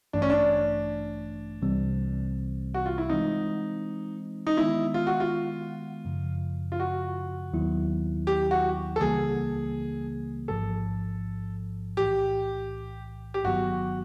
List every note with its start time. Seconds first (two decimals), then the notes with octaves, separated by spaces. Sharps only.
0.13 A1 G2 E3 A3 D4
0.22 C#4
0.30 D4
1.62 C2 C3 E3 G3 C4
2.74 F#4
2.86 F4
2.98 E4
3.09 E3 G#3 C4 D#4
4.47 D#4
4.57 D#3 G#3 B3 E4
4.94 F4
5.07 F#4
5.20 F4
6.05 F#2 C#3 F3
6.72 F4
6.80 F#4
7.53 D#2 D#3 F#3 B3 E4
8.27 G4
8.51 F#4
8.96 A4
9.00 C#2 C#3 E3 G3 A#3 G#4
10.48 A1 G#2 F3 A4
11.97 B1 A2 E3 G4
13.34 G4
13.44 G1 G2 D#3 F#3 B3 F#4